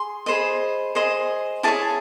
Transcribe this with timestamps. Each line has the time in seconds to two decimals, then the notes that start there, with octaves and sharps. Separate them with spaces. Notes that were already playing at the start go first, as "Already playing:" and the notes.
Already playing: G#4 C6
0.26 G#4 C5 D#5 B5
0.95 G#4 C5 D#5
1.63 E4 G#4 C#5 A5